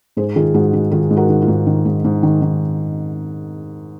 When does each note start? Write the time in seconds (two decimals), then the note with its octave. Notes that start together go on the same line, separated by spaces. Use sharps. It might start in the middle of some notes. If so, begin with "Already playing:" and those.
0.17 G#2 G#4 C5
0.36 D#3 F4 G#4
0.54 G#2 F#4
0.73 D#3 F#4
0.91 D#3 F4 G#4
1.10 G#2
1.17 F#4 A#4
1.29 D#3
1.42 F4
1.48 G#2
1.67 D#3
1.85 G#2
2.04 G#2
2.23 D#3
2.42 D#3